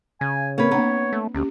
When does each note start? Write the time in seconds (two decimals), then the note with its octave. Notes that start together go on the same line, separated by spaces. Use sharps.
0.21 C#3 G#5
0.58 A#3 C4 B4 C#5
0.71 A#3 B3 D4 A#5
1.13 A3
1.35 D2 C#4 G4